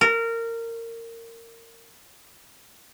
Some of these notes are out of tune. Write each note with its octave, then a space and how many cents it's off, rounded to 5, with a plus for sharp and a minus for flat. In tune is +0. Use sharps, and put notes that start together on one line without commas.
A#4 -20